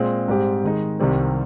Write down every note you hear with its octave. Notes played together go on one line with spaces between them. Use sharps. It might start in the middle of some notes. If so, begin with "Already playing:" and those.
Already playing: A#2 G#3 C4
G#2 G3 C4 G4
D#3 G#3 D#4
C2 C3 D#3 G3 C4